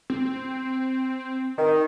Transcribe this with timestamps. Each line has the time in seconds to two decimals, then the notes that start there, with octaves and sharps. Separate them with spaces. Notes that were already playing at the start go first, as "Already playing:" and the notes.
0.10 C4
1.58 D#3